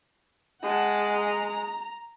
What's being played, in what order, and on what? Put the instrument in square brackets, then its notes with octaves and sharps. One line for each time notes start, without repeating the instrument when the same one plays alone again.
[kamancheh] G#3 [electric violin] F#5 A5
[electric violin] A#5